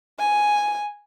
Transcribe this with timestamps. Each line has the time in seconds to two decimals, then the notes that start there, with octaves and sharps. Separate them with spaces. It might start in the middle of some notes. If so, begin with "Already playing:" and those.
0.19 G#5